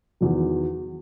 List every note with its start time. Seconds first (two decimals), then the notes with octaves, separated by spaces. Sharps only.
0.21 E2 D#3 F#3